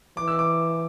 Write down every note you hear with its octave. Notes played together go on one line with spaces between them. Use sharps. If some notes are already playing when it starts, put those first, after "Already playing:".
E3 D6
E6
D6